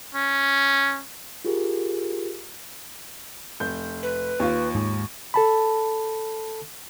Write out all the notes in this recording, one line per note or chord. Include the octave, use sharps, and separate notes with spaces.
C#4
F4 G4 G#4 A#4
F1 G6
B4
D#2 F4
G#2
A4 A5 B5